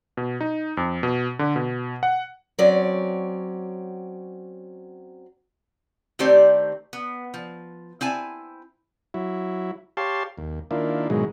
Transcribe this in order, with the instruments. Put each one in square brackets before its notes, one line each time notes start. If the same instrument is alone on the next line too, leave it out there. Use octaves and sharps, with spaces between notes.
[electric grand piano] B2
D#4
F2
B2
D3
B2
F#5
[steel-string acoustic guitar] F#3 C4 C#4 D5
[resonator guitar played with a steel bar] D#3 A3 C4 G4 C5 D5
B3
F3
C4 E4 G#5 A5
[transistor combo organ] F#3 E4
G4 C#5 F5 A5 C6
D#2
D#3 A#3 D4 E4 F4
G#2 B2 D#3 E3 F#3 G#3